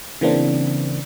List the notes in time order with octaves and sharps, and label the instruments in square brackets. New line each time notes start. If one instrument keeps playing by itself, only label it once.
[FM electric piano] C#3 E3 A#3 C4 D4